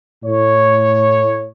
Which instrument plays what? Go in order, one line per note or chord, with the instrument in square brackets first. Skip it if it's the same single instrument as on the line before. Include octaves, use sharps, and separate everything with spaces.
[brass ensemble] A2 C#5